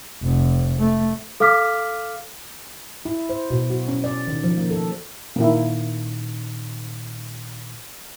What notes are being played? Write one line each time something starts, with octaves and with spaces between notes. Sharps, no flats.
F1
A3
A4 F5 D6 F6 B6
E4
C5
B2
F#4
C#4
D5
D#3
F3
A#3
A4
A#2 D#3 A#3 E4